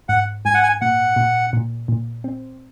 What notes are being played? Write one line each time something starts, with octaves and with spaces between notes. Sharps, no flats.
G#2 F#5
G#2 G#5
F#5
G#5
A#2 F#5
A#2
A#2
A#2
C4